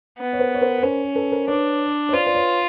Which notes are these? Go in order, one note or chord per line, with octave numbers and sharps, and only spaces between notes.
B3
C#5
A#4 C5
C#5
A#4 C5
B4
C#4 A#4 C5
A4 B4
A#4 C5
D4 B4 C#5
C#5
F4 C5 D5
D5
B4 C#5